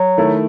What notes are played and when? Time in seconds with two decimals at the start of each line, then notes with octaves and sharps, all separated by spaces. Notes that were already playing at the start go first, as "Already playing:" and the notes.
Already playing: F#3
0.18 D#3 A3 E4